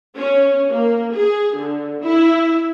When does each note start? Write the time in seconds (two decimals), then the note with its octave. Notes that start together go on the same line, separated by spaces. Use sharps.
0.15 C#4
0.69 A#3
1.13 G#4
1.55 D3
2.02 E4